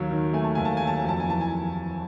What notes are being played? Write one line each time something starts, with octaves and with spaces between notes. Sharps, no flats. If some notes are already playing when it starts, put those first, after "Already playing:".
Already playing: D#2 F#3
D#3
A3 G#5
A5
D#2 G#5
A5
F#3 G#5
A5
G#5
F2 A5
G#5
E3 A5
G#5